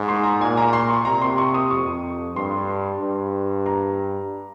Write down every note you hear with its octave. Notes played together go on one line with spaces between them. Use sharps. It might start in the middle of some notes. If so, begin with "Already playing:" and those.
Already playing: G#2
C6
A#5
A#2 G#5
A#5
C6
C#6
C3 A#5
C6
C#6
D#6
F2 C#6
G2 C6
G2
A#5